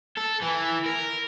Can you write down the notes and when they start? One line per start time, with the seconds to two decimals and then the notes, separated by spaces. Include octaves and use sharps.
0.17 A4
0.42 E3
0.86 A#4